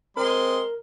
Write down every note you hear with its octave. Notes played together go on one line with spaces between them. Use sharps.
G#3 C4 A#4 C6